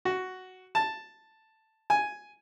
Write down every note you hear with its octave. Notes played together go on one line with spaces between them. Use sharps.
F#4
A5
G#5